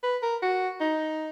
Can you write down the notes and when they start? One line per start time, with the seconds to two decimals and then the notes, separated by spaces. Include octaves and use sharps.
0.03 B4
0.23 A#4
0.42 F#4
0.81 D#4